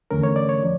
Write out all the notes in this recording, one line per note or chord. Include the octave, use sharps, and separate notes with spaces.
E2 D3 A3 C#4 A#4
C#5
D5
C#5
F3